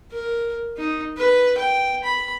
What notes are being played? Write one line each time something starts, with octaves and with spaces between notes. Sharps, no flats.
A#4
D#4
B4
G5
B5